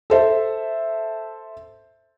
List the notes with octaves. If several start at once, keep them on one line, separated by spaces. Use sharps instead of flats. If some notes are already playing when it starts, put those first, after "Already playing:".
A4 C5 E5